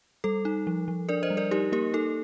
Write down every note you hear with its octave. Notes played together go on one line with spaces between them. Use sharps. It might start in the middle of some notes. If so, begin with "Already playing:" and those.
G3 A4
D#4
F3
F3
D4 A#4 D5
C5 D#5
G3
A#4 D5
D#4 G4 A#4
A#3 G4 A#4
D#4 A4